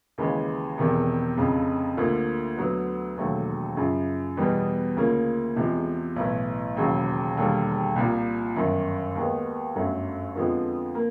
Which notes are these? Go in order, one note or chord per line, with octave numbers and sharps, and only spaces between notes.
D#2 C#3 E3 G#3
E1 E2 C3 D#3
F1 F2 C#3
D2 D3 F3 A#3
D2 D3 F#3 B3
E1 D#2 D3 F#3 A3
F#2 C#3 F3
E2 B2 G3 B3 D#4
D2 C#3 F3 A#3 C#4
E2 C3 F3 G#3
B1 A2 E3
E1 D#2 C#3 F#3
E1 D#2 D3 G3
C2 A#2 F3
G1 F#2 D#3
D#2 D#3 G#3 B3
G1 F#2 D3 F#3 A3
F2 D3 F3 G#3 B3
A#3